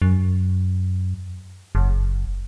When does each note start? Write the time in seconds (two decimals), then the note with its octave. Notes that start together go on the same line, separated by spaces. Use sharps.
0.02 F#2
1.75 F#1